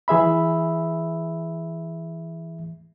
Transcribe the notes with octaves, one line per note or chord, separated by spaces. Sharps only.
E3 G#4 E5 B5